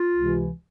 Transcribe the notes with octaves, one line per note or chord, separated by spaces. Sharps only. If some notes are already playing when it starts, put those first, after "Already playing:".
Already playing: F4
C#2 C3 E3